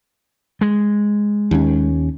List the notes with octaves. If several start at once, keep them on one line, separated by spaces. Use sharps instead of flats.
G#3
D#2 C#4